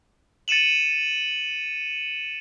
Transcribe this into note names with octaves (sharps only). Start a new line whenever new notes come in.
A6 C#7 D#7 E7 F#7